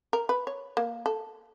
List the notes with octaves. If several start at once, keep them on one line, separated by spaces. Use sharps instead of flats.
A#4
B4
C#5
A#3
A4